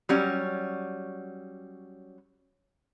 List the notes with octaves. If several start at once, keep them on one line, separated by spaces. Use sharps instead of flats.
F#3 G3 C#4